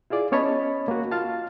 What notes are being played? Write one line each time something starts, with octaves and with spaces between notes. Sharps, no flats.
E4 F4 G#4 D5
B3 C#4 C#5 D#5 A5 B5
A#3 F#4
F4 F5 A5